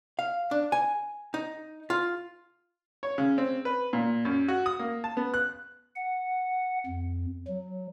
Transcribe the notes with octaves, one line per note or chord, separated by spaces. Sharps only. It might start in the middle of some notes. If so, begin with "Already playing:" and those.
F5
D4
G#5
D#4
F4
C#5
C#3
C4
B4
A#2
F#2
F#4
D#6
A#3
A5
B3
F#6
F#5
F2
F#3